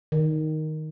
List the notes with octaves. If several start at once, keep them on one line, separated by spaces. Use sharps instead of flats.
D#3